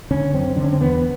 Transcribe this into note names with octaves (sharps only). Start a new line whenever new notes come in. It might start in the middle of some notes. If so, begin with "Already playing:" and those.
D3 C#4
F#2 C4
D3 D4
C#4
C4
E2 B3